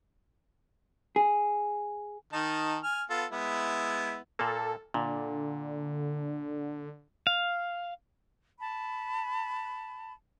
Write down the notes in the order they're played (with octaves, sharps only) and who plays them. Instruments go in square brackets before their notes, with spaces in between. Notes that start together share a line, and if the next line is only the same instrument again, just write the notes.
[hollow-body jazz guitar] G#4
[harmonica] D#3 D#4 A5
G#5 F6
B3 F4 A4
G#3 B3 E4
[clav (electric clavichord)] A#2 A#3 [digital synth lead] A4
[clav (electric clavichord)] A#2 [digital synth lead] D3
[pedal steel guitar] F5
[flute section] A5 B5